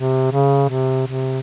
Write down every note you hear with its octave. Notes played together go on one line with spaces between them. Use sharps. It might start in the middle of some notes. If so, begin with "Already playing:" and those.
Already playing: C3
C#3
C3
C3